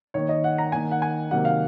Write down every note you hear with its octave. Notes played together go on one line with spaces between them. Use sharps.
D#3 A#3 C#5
D#5
F#5
A#5
D#3 A#3 G#5
F#5
G#5
C3 D#3 F#3 A#3 F#5
F5